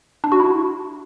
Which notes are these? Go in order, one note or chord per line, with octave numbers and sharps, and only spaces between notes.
D4
F#4
E4